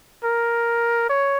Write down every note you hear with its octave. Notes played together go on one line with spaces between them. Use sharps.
A#4
C#5